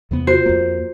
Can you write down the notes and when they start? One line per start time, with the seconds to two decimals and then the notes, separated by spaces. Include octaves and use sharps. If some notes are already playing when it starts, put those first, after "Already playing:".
0.11 E2 C3 B3
0.27 F4 F#4 C5
0.46 F2 A#3